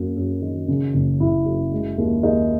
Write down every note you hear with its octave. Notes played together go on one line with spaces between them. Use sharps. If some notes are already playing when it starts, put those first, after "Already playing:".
Already playing: F#2 A#3
F#2
D#3
C#3
F#1
F#1 E4
F#2
G#3
D#2
D#2 D#4